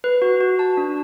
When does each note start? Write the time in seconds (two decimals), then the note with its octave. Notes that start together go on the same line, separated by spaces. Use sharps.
0.04 B4
0.22 F#4
0.41 F#4
0.59 A5
0.77 D4